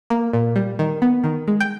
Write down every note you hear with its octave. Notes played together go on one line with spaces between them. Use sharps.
A#3
A#2
G3
D#3
B3
D#3
G#3
G5